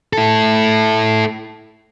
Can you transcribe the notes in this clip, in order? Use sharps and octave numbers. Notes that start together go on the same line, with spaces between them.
E4 A4